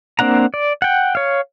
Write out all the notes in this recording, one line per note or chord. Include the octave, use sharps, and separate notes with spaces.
A#3 C4 D4 F#5 A#5
D5
F#5 G5
C#5 F5